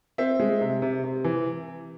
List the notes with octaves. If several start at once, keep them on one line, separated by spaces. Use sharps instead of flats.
C4 E5
G#3
C3
C3
C3
E3